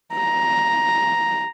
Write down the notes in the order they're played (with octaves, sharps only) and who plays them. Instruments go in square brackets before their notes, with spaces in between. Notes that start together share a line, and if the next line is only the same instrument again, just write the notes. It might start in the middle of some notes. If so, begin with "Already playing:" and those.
[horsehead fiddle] A#5